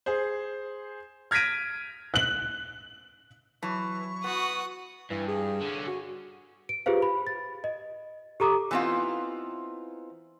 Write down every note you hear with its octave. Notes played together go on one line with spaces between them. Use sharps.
G#4 C5
F6 G#6 A#6 B6 D7 D#7
F#6 F#7
E3 F#3 A5 C#6
B3 F#4 D#6
G2 E3
G#4
D3 C#4
F#4
D7
F4 G4 G#4 B4 C5 F5
B5
A6
D#5
G4 A4 A#5 D6 D#6
E3 B3 C4 D#4 F4